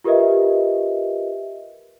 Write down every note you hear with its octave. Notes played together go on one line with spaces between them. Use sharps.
F4 G4 A#4 B4 D#5 E5